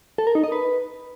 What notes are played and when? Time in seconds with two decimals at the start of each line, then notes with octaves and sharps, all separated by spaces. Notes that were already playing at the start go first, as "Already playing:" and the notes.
0.18 A4
0.27 A#4
0.35 D#4
0.44 D#5
0.52 B4